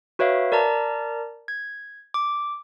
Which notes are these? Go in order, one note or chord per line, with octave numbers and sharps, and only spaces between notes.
F#4 B4 C#5 E5 F5
A#4 D5 A5 A#5
G#6
D6